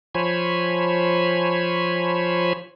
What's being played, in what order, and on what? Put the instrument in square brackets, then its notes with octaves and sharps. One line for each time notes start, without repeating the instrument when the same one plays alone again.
[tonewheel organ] F3 C5 C#5 G#5 B5